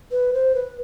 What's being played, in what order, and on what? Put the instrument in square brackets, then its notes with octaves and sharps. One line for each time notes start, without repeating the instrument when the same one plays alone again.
[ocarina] B4
C5
B4